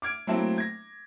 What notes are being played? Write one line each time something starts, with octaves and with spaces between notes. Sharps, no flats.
D6 F6 G#6 D7
F#3 A3 A#3 C4 E4 A5
G#6 A#6